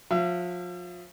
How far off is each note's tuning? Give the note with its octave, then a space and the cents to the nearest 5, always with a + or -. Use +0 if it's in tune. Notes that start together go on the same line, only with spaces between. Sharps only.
F3 +30 E5 +45